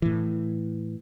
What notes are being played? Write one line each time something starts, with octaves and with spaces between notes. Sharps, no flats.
A2 E3